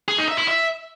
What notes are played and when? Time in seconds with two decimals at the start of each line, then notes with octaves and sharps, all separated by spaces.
0.08 G#4
0.18 D#4
0.28 E5
0.38 E4
0.48 E5